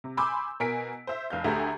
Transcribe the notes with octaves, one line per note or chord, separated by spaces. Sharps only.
C3
G#5 B5 C6 D6 E6 G6
B2 A#4 G#5 B6 D7
C5 E5
F1 F5 G6
D2 A3 G4 G#4 E5 A#5